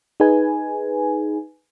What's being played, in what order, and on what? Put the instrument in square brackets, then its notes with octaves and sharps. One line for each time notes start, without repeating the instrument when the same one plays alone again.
[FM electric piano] D#4 G#4 B4 G#5